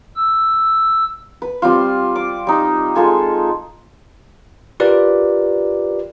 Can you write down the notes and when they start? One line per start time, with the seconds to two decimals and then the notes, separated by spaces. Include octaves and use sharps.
0.16 E6
1.42 B4
1.62 G3 C4 F4
2.16 D6
2.47 G3 D#4
2.95 G#3 F4 A4 G#5
4.80 F4 G4 A#4 B4 D5